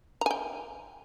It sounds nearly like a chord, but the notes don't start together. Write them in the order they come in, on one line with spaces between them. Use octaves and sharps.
A#5 G#5 G5